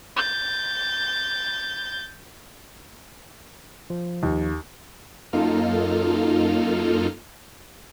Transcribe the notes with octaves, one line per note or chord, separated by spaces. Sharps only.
G6 A6
F3
D#2
F#2 A#3 D#4 F4 A4 F6